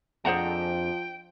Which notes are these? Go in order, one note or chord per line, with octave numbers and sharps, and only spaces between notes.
F2 F3 D4 G#4 C5 F#5 G5 A#5